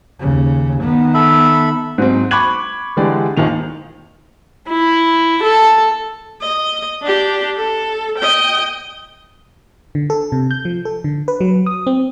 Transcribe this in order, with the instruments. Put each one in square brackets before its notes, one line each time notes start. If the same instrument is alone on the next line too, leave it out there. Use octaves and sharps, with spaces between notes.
[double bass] D#2 C#3
D#3 B3
[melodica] A4 E5 B5
[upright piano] G#2 F#3 C4
B5 C#6 D6 F#6 G#6 F#7
D3 E3 G#3 G4 D5
G#1 D#2 A#2 D#3 F7
[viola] E4
A4
D#5
D4 G4
A4
D#5 G5
[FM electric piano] D3
A4
C3
G6
F3
A4
D3
B4
F#3
D#6
C4